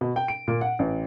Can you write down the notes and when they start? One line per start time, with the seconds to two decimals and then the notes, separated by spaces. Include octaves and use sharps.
0.01 B2
0.16 G5
0.28 D7
0.48 A#2
0.61 F#5
0.79 A1